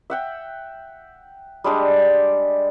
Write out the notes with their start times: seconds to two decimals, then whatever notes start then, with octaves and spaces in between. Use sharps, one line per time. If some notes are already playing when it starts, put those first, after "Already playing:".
0.10 E5 F#5 G5
1.64 G3 G#3 D4 G4